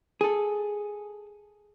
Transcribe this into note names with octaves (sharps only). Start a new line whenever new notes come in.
G#4 A4